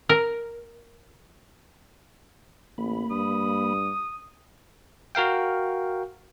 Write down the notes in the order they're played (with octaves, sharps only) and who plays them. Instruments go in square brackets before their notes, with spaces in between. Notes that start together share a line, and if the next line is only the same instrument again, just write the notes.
[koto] A#4
[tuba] A1 [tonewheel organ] A#3 B5
[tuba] G2 [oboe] D#6
[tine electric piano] F#4 A#4 F5 G5